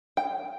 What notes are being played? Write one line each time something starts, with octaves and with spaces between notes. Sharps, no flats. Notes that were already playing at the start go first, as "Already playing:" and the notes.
G5